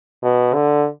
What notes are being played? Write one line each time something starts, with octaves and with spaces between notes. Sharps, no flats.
B2
D3